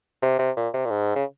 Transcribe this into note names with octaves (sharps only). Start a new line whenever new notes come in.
C3
C3
A#2
C3
A#2
G#2
C#3